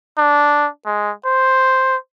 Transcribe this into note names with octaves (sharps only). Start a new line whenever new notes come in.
D4
G#3
C5